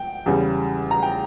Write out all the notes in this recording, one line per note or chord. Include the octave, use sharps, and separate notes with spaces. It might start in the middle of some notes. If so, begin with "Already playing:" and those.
Already playing: G5
E2 C#3 G3
A#5
G5